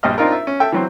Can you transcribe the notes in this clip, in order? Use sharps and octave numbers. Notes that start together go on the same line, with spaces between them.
A#1 G2 G4 D#5 F6
C4 D4 D#4 F4 A#4
E5
C#4
A4 E5 G5
E3 F#3 C4